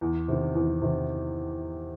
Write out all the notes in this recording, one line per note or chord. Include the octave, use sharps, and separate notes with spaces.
E2
C3 D#3
E2
C3 D#3